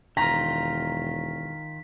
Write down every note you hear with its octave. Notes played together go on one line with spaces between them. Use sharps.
E1 D#3 F4 A#5 B6